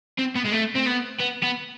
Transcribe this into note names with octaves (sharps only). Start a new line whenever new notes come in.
C4
B3
G#3
A3
C4
B3
B3
B3